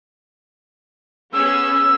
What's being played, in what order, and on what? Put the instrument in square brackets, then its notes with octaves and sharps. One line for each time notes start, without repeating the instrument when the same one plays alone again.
[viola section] B3 C#4 G#4 [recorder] E6